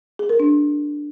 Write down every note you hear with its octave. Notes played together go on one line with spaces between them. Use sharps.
G#4
A#4
D4